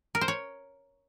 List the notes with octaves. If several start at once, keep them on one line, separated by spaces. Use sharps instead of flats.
A#4
C5
C#5